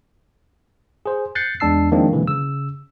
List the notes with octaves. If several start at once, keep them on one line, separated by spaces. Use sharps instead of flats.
G#4 C5
F#6 G6 A6 C7 C#7
E2 G#3 D4 A5 E6 C7
D#3 F3 G#3 A#3 C4 D4
B2 D3 E3 F#3 G#3 A#3
C#3 E6